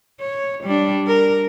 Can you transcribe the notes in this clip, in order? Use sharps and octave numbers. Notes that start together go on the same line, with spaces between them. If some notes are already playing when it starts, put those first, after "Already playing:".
C#5
G3 D4
A#4